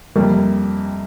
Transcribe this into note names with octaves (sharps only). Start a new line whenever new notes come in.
F2 C3 G3 A#3